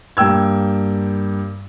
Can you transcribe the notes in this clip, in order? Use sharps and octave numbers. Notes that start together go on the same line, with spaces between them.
G2 A#3 G5 E6 G#6